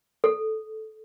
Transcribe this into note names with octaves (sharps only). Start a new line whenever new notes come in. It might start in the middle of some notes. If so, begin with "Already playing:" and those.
A4